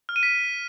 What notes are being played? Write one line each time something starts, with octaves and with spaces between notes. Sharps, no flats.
F6
D#7
B6